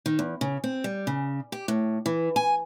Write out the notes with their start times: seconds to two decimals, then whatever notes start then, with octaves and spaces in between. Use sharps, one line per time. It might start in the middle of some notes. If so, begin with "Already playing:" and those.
0.06 D#3
0.19 E2
0.41 C#3
0.64 C4
0.84 G3
1.07 C#3
1.52 G4
1.68 A2
2.06 E3
2.36 G#5